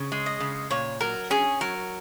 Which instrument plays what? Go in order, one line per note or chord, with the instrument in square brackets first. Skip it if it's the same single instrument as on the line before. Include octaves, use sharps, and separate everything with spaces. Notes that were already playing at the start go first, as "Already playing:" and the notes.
Already playing: [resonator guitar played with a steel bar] C#3
G#3
[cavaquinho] D#5
[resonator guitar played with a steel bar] C#3
[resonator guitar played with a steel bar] A#2 [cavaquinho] C#5
[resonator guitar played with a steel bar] F#3 [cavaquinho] A#4
[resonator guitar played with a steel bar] C#4 [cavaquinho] G#4
[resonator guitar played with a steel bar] F#3 [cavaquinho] A#4